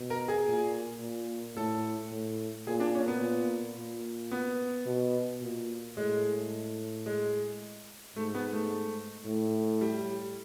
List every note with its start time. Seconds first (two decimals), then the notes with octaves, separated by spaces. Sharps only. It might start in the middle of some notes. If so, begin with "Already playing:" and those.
Already playing: B2
0.10 A#4
0.28 G#4
0.47 A#2
1.01 A#2
1.56 A2 A4
2.12 A2
2.67 A#2 G#4
2.80 D4
2.95 C#4
3.08 B3
3.21 A#2
3.77 A#2
4.31 B3
4.86 B2
5.41 A#2
5.97 A2 G#3
7.06 G#3
8.16 G#2 A3
8.35 B3
8.53 A3
9.26 A2
9.81 G3